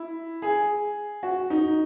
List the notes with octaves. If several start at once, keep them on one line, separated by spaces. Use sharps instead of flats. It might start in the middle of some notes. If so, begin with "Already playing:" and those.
Already playing: E4
G#4
F#4
D#4